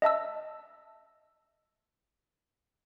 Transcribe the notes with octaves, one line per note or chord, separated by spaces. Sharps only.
D#5 E5 A5 E6